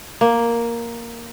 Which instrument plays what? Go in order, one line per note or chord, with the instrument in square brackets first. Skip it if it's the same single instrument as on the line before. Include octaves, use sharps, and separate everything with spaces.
[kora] A#3